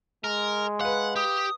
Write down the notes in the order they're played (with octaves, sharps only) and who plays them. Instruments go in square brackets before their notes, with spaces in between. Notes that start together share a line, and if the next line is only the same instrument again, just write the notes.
[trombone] G#3 [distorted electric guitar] A#4
[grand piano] B4 F5 [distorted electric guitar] F#5
[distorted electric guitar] G4 [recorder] D#6